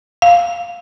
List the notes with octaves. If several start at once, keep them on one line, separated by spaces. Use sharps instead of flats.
F5